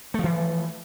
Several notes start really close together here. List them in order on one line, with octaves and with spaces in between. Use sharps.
A3 F3 E3